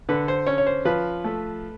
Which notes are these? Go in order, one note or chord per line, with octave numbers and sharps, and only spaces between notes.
D3 B4
C5
C#4 C#5
C#5
C5
F3 B4
A3